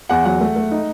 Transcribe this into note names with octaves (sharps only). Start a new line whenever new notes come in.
E2 F#5
F#3 F#5
A3
A3
D#4